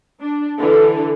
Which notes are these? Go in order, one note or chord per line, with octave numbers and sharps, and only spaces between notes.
D4
D3 E3 A4